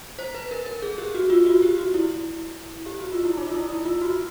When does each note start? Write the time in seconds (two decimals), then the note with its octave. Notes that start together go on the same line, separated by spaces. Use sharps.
0.19 C5
0.35 B4
0.51 A#4
0.66 A#4
0.82 G#4
0.98 G4
1.15 F#4
1.30 F4
1.46 F#4
1.62 G4
1.78 F#4
1.94 E4
2.86 G4
2.99 F#4
3.12 F4
3.25 E4
3.38 D#4
3.46 F4
3.54 E4
3.69 E4
3.85 F4
4.01 F#4